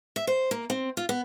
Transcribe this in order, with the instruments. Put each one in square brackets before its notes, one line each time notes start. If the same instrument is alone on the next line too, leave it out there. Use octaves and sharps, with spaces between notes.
[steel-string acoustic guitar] E5
C5
A#3
C4
F4
B3